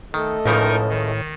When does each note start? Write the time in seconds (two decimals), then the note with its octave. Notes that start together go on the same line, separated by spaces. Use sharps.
0.14 D#3 A3 A4 D#5
0.46 C#2 A2 C#3 F3 D#4 A#4
0.89 D#3